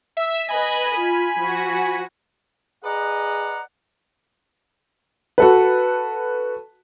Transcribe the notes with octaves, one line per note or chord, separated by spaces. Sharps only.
E5 E6
B4 D#5 G#5 B5
F4
F3 F#4
G#4 B4 D5 D#5 F#5 A#5
F#4 A4 B4